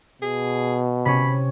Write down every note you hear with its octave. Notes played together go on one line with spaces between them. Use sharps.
B2 G#4
C3 C#4 B5